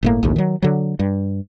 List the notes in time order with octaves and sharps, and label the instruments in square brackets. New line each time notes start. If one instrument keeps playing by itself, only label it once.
[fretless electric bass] G1 A2 A#3
A#1 D#2 A2
D#3 F#3
D3 F#3
G2